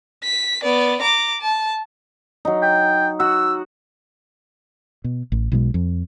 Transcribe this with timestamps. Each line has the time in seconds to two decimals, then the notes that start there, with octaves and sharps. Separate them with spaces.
0.23 B6
0.63 B3 D5
1.01 A#5 D6
1.41 A5
2.45 F#3 D#4
2.62 G5
3.20 F#4 E6
5.04 B2
5.32 A1
5.52 B1 B2 G#3
5.74 F2